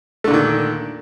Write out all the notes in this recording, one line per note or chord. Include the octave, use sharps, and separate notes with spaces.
A#2 D3 D#3 A3